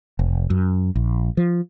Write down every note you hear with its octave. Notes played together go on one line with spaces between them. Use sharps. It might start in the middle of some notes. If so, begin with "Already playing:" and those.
F1
F#2
A#1
F3